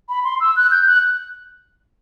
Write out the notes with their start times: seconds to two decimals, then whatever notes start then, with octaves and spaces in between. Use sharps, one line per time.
0.09 B5
0.24 C6
0.40 E6
0.57 F#6
0.71 G6
0.87 F#6